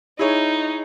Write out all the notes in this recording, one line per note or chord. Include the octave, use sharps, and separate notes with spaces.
D#4 E4 G#4 C#5